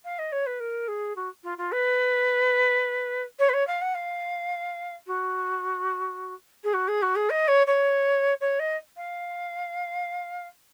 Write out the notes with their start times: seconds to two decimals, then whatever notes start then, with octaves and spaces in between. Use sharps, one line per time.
0.04 F5
0.18 D#5
0.32 C#5
0.46 B4
0.60 A#4
0.88 G#4
1.16 F#4
1.43 F4
1.58 F4
1.72 B4
3.39 C#5
3.49 B4
3.53 C#5
3.67 F5
3.81 F#5
3.94 F5
5.06 F#4
6.64 G#4
6.73 F#4
6.88 G#4
7.02 F#4
7.15 G#4
7.30 D#5
7.48 C#5
7.67 C#5
8.40 C#5
8.59 D#5
8.96 F5